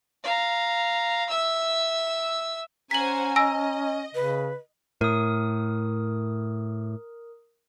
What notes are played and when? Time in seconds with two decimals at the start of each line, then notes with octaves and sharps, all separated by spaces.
0.24 F5 A#5
1.29 E5 E6
2.91 C#4 C5 F#5 G#5 A#5 B6 F#7
3.36 D#5 G#5 E6 A#6
4.15 C#3 B4
5.01 A2 A#4 D#6